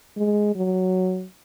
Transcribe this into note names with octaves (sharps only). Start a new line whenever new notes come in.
G#3
F#3